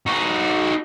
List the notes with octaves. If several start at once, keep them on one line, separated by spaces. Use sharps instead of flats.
D#4 F#4